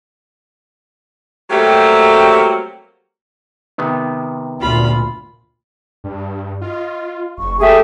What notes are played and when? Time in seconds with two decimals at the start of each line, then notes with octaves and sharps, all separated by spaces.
1.50 F#3 G3 A3 A#3 C4 G4
3.78 C3 D#3 B3
4.61 D2 A#2 F4 B5
6.04 G2
6.61 F4 D#5
7.38 F#1 C#6
7.59 A3 G4 G#4 E5